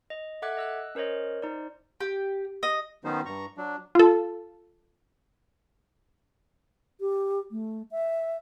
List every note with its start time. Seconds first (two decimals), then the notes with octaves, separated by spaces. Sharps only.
0.10 D#5
0.42 A4 E5 F#5 D6 F#6 G#6
0.57 D#5 E6 F#6
0.95 C#4 A#4 C5 C#5 D#5
1.42 D#4 C5 D5
2.00 G4
2.63 D#5
3.05 D#3 F#3 B3 C#4 D#4 C5
3.25 G2 A#5 C#6
3.57 F#3 D4
3.95 F4 A4
7.01 G4
7.51 A3
7.91 E5